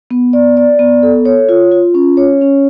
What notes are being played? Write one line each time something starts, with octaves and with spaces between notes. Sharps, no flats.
B3
D5
D5
B3
A4
C#5
F4
F4
C#4
C#5
C#4